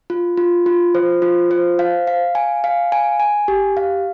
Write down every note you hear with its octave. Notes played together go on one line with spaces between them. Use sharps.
F4
F4
F4
C5
F4
C5
F5
F5
G#5
F5
G#5
G#5
G4
F5